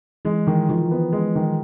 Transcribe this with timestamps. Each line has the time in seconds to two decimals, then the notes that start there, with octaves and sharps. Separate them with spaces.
0.25 E3 G#3
0.47 D#3 E3
0.69 D#3 F3
0.91 B3
1.13 G#3
1.35 D#3